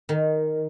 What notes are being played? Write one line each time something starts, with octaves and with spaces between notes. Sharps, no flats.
D#3